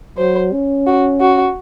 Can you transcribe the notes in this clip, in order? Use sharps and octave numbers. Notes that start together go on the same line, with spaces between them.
F#3 C5
C#4
F#4
F#4